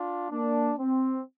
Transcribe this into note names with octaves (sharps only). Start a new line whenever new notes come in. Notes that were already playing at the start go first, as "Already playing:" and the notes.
Already playing: D4 F4
A#3 D4
C4